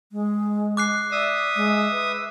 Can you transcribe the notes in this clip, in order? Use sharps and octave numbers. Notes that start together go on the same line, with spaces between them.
G#3
D6 F#6 C7
D5 E5 D#6
G#3
B4